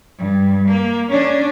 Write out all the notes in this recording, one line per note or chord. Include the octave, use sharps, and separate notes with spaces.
G2
A#3
C#4 D4